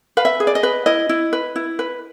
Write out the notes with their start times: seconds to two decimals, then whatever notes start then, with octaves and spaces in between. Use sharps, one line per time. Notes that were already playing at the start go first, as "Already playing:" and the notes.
0.17 B4 F5
0.25 E5
0.40 G#4
0.47 D5
0.55 D#5
0.63 B4
0.86 E4 D#5
1.09 E4
1.33 B4
1.56 E4
1.79 B4